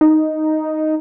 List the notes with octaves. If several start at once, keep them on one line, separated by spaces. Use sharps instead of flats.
D#4